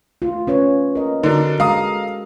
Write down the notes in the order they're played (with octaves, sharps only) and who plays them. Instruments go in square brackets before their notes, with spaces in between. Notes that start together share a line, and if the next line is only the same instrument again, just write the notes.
[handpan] A3 F4
C#4 B4 C#5
A#4 D#5
[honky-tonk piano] D3 D4 [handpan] F#4 A#4
[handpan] G#3 A4 [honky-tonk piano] F5 A#5 D#6